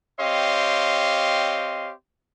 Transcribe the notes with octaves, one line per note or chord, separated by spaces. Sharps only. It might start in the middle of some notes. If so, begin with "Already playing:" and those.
C4 G4 C#5 D#5 F5 C6